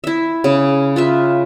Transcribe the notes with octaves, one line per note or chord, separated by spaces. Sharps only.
E4 E5
C#3
F4 B4 E5